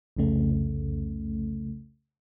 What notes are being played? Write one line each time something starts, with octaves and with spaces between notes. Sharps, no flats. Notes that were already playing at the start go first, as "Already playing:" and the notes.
C2 F2 C#3 A3